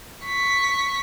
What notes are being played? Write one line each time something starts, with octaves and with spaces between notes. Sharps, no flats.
C#6 B6